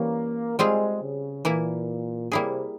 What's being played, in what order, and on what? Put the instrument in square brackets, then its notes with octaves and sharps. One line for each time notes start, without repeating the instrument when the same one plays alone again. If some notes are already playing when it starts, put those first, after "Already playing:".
Already playing: [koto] E3 G3 C#4 [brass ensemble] A#3
[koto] G3 C4 F4 G#4 [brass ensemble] G#3
[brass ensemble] C#3
[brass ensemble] A#2 [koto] E3 A#3 E4
[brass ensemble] C3 [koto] G3 A#3 E4 G#4